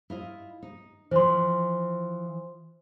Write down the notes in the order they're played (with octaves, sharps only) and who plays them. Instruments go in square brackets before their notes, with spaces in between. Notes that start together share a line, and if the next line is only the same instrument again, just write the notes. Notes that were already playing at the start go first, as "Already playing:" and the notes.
[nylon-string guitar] E4 F4 D#5
D#4
[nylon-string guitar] E3 F3 [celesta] C5 C6